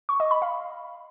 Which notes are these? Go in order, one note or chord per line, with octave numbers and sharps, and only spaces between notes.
C#6
D#5
B5
F5